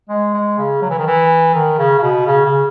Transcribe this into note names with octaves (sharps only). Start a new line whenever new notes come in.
G#3
G#3
C#3
F#3
E3
D#3
E3
D#3
C#3
C#3
B2
C#3
C#3